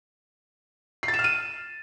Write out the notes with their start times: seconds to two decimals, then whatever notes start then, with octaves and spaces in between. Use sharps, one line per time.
1.03 C7
1.08 A6
1.14 E7
1.19 F6
1.24 D#7